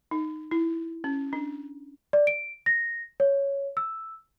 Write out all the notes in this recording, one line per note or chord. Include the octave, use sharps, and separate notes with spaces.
D#4
E4
C#4
D4
D5
D7
A#6
C#5
E6